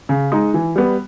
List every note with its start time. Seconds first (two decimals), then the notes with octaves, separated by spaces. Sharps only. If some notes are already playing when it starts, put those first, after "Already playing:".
0.09 C#3
0.32 G#3 D#4
0.54 E3
0.76 G3 B3